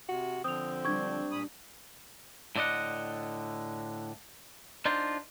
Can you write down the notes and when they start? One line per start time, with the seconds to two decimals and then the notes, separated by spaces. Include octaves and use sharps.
0.09 C3 F#4
0.44 D3 F3 C4 D#6 F7
0.85 G3 D4 G4 C#6 G#6
1.31 A#2 B5 D#6
2.56 A2 D3 D5 D#5 F#5
4.85 D4 D#4 F4 C5 D5